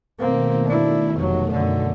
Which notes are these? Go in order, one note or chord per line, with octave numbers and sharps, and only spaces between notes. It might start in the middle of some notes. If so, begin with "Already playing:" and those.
B2 D#3 A3 A#3 C4
D4 E4
F1 F#3
F#2 D3